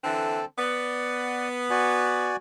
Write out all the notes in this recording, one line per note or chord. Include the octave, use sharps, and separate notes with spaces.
D3 E3 C4 A4
B3 D5
F#4 D5 G#5